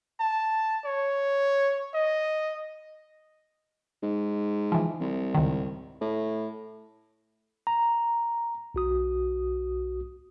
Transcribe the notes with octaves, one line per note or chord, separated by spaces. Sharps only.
A5
C#5
D#5
G#2
E3 F3
C2
C#2 G#2 D#3
A2
A#5
B1 F#4 D#6